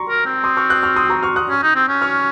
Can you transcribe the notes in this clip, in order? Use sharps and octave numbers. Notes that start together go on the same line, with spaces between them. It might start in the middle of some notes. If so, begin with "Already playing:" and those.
Already playing: A#5 C6 C#6
A#4
C4
C6 D#6
C#6 F6
D#6 F#6
C#6 F6
C6 D#6
A#5 C#6
C#6 F6
D#6 F#6
C#4
D#4
C4
C#4
C#6 F6